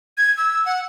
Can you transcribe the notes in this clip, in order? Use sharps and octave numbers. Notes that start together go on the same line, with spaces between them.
G#6
E6
F#5